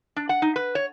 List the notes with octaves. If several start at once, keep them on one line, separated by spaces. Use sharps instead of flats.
D4
F#5
D#4
B4
C#5